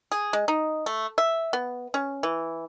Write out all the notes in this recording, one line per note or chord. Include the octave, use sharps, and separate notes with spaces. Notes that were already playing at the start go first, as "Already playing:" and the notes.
G#4
G#3
D#4
A3
E5
B3
C#4
E3